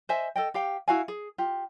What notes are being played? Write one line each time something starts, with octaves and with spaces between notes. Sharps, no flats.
C5 D#5 E5 G#5
A4 D#5 G5
G4 F5 G5
E4 F#4 F5 G#5
G#4
F4 G4